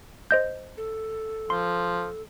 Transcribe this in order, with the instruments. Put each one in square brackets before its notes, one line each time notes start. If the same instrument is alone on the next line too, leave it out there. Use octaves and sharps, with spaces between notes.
[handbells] C5 D#5 G6
[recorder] A4
[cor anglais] F3 [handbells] C6